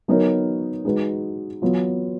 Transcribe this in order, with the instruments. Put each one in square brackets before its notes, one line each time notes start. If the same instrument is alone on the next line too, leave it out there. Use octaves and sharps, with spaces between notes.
[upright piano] F#3 B3 D#4 A#4 C#5
G#3 D#4 F#4 B4
F#3 B3 F4